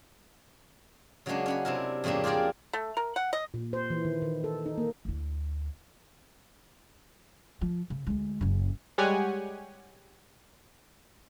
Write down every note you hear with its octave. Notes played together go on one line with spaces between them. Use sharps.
C#3 F#3 G#3 A#3 C#4 D4
C#4 F#5 B5
C3 D4 E4 A#4
F2 A2 C#3 A#3 D4
F4 G4 G#4 A#4 D5
A3
A#4
F#5
D#5
A#2
C5
E3
D#3
D#3
A4
D#4
A#3
D2 E4
F3
C#3
D2 G#3
F#1 C#3
G3 G#3 G4 C#5 F#5 G#5